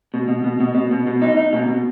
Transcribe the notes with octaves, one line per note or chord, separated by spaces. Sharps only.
B2
B2
B2
B2
B2
B2
B2
D#4
D#4
B2
B2